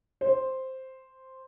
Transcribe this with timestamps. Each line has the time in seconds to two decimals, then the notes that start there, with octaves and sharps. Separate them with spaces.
0.21 C5